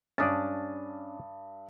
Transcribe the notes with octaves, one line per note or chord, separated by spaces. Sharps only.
G2 C#4 D4 D5 D#6 A6